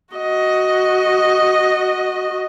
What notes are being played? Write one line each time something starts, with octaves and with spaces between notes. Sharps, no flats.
F#4 D#5